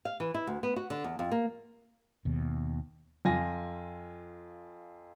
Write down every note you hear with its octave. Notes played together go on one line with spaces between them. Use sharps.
F5
E3
E4
D2
B3
F#4
D3
E2
F2
A#3
D#2 B2
F2 F4 G#5 A#6